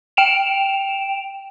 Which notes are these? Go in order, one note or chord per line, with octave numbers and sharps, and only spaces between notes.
G5 D7 E7 F7